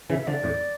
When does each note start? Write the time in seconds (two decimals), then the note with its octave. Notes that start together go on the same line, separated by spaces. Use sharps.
0.10 C#3 E3 E5
0.21 E5
0.27 D3 F3 D5
0.43 F2 A2